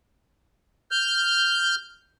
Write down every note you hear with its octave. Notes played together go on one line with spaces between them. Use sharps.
F6 G6